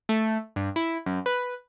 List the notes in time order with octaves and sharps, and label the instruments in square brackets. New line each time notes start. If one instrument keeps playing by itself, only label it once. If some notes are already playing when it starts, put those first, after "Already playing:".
[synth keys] A3
G2
E4
F#2
B4